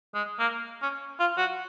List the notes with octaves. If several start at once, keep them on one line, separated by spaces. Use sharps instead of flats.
G#3
A#3
C#4
F4
F#4